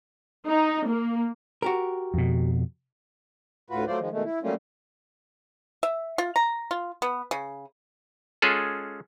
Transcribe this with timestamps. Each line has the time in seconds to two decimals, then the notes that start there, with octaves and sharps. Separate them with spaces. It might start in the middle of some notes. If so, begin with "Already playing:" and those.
0.48 D#4
0.87 A#3
1.62 F#4 G4 A#4
2.14 F2 B2
3.70 D2 A2 F4 F#4 B4
3.87 F#3 A3 F4 C5 D5
3.99 D#3 F3 G#3
4.12 B2 D#3 G#3 A3
4.24 E4
4.43 F#3 G3 A3 A#3 C#4 F4
5.83 E5
6.18 F4
6.36 A#5
6.71 F4
7.02 B3
7.31 C#3
8.42 G#3 C#4 F4 G#4 A4